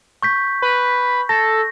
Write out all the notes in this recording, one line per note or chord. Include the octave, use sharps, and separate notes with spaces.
C#6 G6 B6
B4
A4 A#6